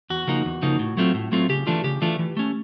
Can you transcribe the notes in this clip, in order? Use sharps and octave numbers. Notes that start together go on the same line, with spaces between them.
E2 F#4
C#3 F3 A#3 D#4
E2
C#3 F3 A#3 D#4
A2
F#3 A3 C4 F4
A2
F#3 A3 C4 F4
C#3 G4
E3 A3 D4 F4
C#3 G4
E3 A3 D4 F4
E3
A3 C#4